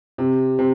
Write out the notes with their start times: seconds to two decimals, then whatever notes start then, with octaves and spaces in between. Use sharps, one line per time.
0.18 C3
0.59 C3